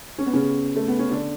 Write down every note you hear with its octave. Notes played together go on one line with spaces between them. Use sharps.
C#4
B3
C#3 C#4
A3
B3
C#4
D3 D4